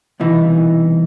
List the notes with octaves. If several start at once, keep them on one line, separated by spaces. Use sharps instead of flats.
C2 B2 E3 D#4